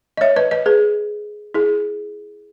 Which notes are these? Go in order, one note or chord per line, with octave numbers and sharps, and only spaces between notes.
D#5
C#5 E5
B4 D#5
B4 D#5
G#4 B4
E4 G#4